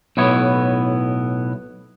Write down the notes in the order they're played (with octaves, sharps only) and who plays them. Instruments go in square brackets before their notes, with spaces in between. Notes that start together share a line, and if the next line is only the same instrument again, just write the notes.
[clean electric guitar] B1 A2 B3 E4 C#5